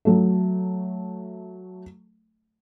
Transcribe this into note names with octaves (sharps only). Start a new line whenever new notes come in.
F#3 A3